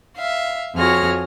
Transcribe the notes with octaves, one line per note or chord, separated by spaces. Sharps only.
E5 F5
F2 F#4 G#4 C#5 F6 A#6